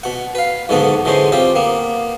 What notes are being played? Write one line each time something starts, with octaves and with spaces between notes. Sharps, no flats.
B2 F#5
B4 F5
B1 G#2 B2 D3 B3 F#5
D3 E3 G#3 C#4 C5
G3 C4 F4 G4
A#3 B3